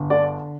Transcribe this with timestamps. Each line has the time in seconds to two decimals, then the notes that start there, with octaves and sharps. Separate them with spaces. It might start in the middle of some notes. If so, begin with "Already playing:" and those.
Already playing: G1
0.10 D3 D5